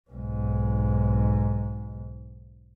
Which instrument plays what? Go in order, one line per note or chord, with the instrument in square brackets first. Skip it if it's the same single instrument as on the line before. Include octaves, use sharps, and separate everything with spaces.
[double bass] B1 G#2